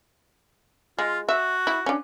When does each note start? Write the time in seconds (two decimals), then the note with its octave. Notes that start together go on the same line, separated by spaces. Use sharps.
0.99 G#3 F4
1.29 F#4 E5
1.67 E4
1.86 C#4 D4